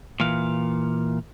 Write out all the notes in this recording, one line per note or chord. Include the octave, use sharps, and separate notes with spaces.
A#2 E3 F5